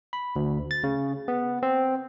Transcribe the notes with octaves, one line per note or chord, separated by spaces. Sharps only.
B5
D2
A6
C#3
B3
C4